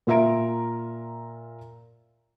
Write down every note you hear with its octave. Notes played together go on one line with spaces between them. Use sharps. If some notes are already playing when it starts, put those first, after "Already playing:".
A#2 F4 E5 A#5 D7